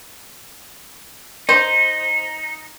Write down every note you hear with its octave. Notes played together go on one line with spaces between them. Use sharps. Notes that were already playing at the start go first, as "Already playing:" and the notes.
D#4 C5